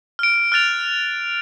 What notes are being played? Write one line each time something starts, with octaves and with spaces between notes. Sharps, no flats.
F6 D7
F6 F#6 A6 F7